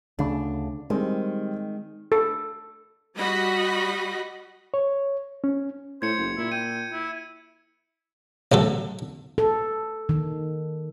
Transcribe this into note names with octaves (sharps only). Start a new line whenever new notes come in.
D2 C#3 A3 D4
D#3 G3 G#3 C4
A4
G3 F#4 D#5 B5
C#5
C#4
A2 C5 G#6 C#7
F#1
A#2 E4
G5 D#7
E4
A1 A2 F#3 A4
A4
D#3